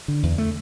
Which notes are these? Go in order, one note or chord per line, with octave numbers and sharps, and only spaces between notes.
D3
E2
A3